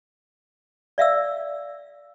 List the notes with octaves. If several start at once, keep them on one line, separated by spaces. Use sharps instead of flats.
D5 E5 F5 E6